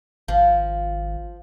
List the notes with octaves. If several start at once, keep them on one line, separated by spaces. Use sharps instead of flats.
G#1 F3